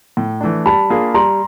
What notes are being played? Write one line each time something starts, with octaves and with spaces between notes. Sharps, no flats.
A2
E3 A3 D4
G3 A5 B5
A#3 D4 F4 G#4
G3 A#5 C6